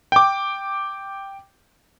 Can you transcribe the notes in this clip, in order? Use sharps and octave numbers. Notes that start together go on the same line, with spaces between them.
G5 D6